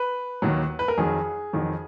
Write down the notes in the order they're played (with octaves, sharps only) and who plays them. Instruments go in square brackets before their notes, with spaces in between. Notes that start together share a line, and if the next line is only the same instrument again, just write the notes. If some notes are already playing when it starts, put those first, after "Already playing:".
Already playing: [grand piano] B4
D#2 D#3 F#3
B4
A#4
F2 D#3 F#3 G#4
F2 D#3 F#3